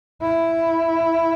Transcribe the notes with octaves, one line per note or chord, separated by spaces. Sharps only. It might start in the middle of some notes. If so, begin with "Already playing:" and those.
E4